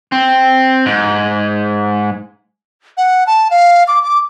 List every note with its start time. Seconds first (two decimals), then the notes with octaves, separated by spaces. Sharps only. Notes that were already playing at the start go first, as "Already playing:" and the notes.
0.12 C4
0.86 G#2
2.97 F#5
3.27 A5
3.51 F5
3.88 D6
4.02 D6